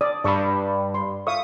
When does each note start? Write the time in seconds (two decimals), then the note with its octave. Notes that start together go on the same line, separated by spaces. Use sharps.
0.01 D5 D#6
0.24 G2 D5 A5 B5 C#6 E6
0.94 C6
1.27 E5 F5 C#6 D#6